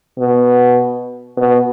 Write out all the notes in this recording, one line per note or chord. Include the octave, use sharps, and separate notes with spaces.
B2
B2